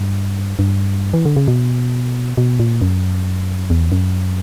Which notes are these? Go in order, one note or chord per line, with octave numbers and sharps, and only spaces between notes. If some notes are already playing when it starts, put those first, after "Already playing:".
Already playing: G2
G2
E3
D3
C#3
B2
B2
A#2
F#2
E2
F#2